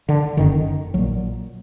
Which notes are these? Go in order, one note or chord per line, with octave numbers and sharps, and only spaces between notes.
D3
F#1 F#2 D3 D#3
A#1 A#2 F#3